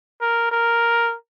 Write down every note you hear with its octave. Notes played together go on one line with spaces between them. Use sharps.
A#4
A#4